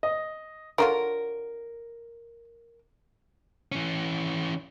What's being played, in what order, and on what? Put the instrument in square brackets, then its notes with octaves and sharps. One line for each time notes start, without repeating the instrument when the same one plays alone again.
[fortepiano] D#5
[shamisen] D3 F#3 F4 [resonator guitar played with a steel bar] A#4
[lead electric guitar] E3 C#4